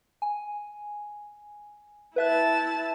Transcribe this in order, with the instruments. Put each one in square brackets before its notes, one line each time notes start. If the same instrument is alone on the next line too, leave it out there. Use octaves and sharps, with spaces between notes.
[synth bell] G#5
[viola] E4 A5 [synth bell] B4 E5 F#6